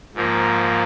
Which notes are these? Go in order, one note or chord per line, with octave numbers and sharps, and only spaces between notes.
G#2 F3 A#3